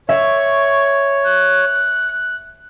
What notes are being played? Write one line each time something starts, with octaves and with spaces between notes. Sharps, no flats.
C#5 E5 C#6
F#6